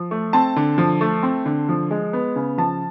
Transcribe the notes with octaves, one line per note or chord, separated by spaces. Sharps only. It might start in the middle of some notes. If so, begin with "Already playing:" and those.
Already playing: F3
A3
C4 A5
D3
F3
A3
C4
D3
F3
G#3
B3
C#3
F3 A5